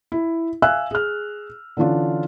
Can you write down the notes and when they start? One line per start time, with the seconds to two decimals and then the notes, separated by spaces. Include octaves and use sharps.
0.12 E4
0.62 E5 F5 G#5 E6 F#6
0.91 G#4 F6
1.77 D3 E3 C#4 D4 F4